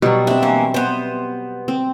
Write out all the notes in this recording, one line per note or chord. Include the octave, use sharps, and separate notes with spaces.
B2 F#3 G3
C4 D4 E5
E3 A#3 C#4
B3 C5
C4